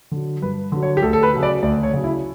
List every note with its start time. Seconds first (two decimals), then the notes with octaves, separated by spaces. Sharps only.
0.11 D3 F#3
0.42 G2 B4
0.72 D3 F#3
0.83 C#5
0.97 G4
1.02 D2 A4
1.13 A4
1.23 B4
1.33 C#3 F#3
1.43 D5
1.63 D2 D5
1.83 C#5
1.93 C#3 F#3
2.04 E4